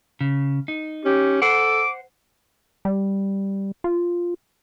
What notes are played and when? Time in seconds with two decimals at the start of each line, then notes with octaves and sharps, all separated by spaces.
0.21 C#3
0.68 D#4
1.05 C#4 G4
1.42 A4 C5 F#5 D6
2.85 G3
3.84 F4